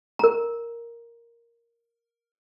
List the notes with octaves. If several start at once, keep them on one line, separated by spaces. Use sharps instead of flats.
A#4 A#5